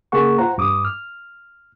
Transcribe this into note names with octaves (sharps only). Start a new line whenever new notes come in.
C#3 A#3 G#4 F#5 C#6
F4 C5 F#5 A#5
G2 D6 D#6
F6